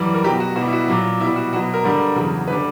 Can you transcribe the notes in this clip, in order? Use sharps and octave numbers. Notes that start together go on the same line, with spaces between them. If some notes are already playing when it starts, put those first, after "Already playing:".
Already playing: F#2 E3 G3
A#4
B2 F#3 G4
F#4
B2 G3 F#4
E4
F#4
A#2 F#3
B2 G3 E4
F#4
B2 F#3 F#4
A#4
G2 D3 G3
E2 C#3 F#3
B4
D3 G3